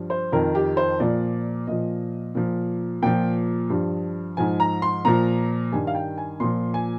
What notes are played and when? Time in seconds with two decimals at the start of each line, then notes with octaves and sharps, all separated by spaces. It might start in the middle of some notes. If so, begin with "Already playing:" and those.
Already playing: G2 F3
0.10 C5
0.32 F2 D#3 A#4
0.55 G4
0.77 C5
1.00 A#2 F3 D5
1.67 A#2 F3 D#5
2.35 A#2 F3
3.02 A#2 F3 G5
3.70 G2 F3
4.37 G#2 F3 G#5
4.60 A#5
4.82 C6
5.05 A#2 F3 A#5
5.72 G2 D#3 G#5
5.87 F5
5.95 G5
6.18 G#5
6.40 A#2 F3 C6
6.74 G#5